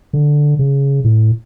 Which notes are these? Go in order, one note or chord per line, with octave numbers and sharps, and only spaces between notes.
D3
C#3
A2